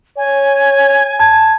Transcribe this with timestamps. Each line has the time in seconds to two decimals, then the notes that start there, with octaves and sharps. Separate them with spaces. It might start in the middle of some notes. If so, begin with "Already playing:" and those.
0.17 C#5 G#5
1.19 A5 G#6